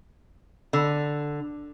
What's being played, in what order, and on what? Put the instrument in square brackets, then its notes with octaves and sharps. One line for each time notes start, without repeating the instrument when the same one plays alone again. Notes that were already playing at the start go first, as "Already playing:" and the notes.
[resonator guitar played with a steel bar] D3